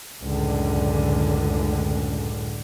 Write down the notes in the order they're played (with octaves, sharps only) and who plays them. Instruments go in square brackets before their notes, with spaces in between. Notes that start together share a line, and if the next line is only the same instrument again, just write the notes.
[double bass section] C#2 F#2 A2 D3